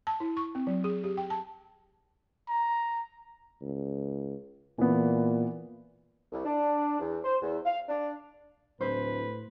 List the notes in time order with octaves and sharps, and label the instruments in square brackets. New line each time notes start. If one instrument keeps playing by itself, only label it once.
[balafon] A5
E4
C#6
C4
F#3
G#4
G4
G5
A5
[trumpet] A#5
[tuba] C#2
[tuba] A#2 [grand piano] E3 B3
[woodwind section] C2
D4
E2
C5
E2
F5
D4
[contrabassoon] D1 [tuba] A2 [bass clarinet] B4 [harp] C5